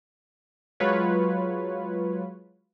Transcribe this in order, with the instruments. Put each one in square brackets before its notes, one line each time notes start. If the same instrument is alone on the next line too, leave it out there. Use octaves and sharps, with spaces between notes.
[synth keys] F#3 G#3 F4 B4 C#5